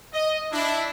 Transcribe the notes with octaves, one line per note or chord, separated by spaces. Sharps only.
D#5
D4 E4